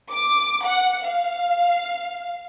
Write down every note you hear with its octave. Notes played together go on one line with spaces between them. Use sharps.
D6
F#5
F5